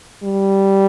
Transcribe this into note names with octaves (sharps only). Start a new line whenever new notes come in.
G3